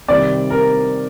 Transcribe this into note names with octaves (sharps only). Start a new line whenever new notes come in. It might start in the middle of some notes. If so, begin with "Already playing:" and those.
C3 D#3 G3 D5
A#4